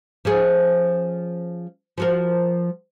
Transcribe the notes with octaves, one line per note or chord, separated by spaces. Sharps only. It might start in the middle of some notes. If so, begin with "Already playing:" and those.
F3 C#4 G#4
F3 F#4 A#4